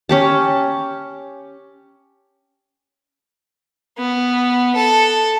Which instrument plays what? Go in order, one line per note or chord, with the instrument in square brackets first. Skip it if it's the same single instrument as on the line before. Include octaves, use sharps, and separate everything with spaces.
[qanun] C#4 G4 A5
[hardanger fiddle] B3
A4